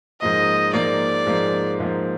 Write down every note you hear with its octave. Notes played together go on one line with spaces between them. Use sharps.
G#2 F3 A#3 D#5
G#2 F3 A#3 D5
G#2 F3 A#3
G#2 F3 A#3